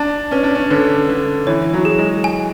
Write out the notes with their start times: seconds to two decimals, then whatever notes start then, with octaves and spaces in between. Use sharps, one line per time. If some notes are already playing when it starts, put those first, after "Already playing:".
Already playing: D4 A5
0.31 C#4 B4
0.43 D4
0.55 C#4
0.70 D3 B4
1.08 D3 B4
1.47 E3 C#5
1.74 F#3
1.85 G#4
1.99 G#3
2.24 G#5